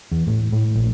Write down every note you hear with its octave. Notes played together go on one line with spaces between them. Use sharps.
E2
A2
A2
A#1